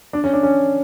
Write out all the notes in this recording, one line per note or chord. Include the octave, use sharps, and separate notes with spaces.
D4
C#4
D4
C#4